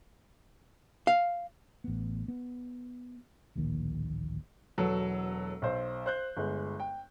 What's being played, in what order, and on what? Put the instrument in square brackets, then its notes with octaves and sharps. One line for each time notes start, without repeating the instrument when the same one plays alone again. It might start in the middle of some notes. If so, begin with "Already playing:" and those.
[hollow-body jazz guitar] F5
[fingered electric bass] A1 B3
B3
D1 A#1 A#2 D#3
[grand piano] E1 F#3 A4 B4 E6
B1 C5
C5 F#6 G6
G1 G#3
G5